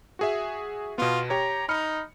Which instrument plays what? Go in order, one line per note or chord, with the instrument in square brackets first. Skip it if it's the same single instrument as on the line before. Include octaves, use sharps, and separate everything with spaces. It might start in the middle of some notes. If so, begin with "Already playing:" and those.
[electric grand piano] F#4 G#4 E5
[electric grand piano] B2 B3 [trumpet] F4
[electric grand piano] G4 C#5 [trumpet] A#5
[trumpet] D#4 [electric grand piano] B5 F6 C#7